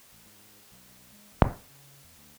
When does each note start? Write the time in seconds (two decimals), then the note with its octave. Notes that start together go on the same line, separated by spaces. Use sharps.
0.12 A1
0.26 G#2
0.72 B1
1.12 G#3
1.32 E1
1.46 F2
1.69 C#3
2.04 E2
2.17 D2